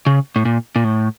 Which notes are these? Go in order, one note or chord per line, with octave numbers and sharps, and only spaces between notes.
C#3
A2
A#2
A#2
A2